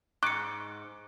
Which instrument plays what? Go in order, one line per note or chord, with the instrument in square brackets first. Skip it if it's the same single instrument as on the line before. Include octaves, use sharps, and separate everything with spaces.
[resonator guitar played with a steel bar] G#2 [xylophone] C#6 C#7 [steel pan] D6 [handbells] F#6